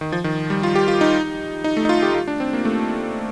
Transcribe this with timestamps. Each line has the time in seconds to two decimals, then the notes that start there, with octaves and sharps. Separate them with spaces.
0.01 D#3
0.12 F3
0.24 D#3
0.50 G3
0.63 F4
0.76 G4
0.88 F4
1.01 D#4
1.64 D#4
1.77 A3
1.85 D#4
1.89 F4
2.02 G4
2.14 F4
2.28 D4
2.40 C4
2.53 A#3
2.65 A3